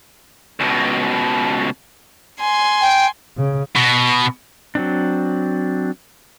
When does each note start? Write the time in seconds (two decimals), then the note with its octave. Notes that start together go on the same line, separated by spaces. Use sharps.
0.60 C#2 B2
2.40 G#5 C6
2.81 G5
3.37 C#3
3.76 B2
4.75 F#3 C4 D4